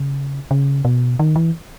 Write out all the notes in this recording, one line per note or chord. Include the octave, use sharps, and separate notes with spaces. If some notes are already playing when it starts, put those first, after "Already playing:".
Already playing: C#3
C#3
B2
D#3
E3